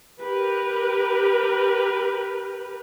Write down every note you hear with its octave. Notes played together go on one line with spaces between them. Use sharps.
G4 A#4 B4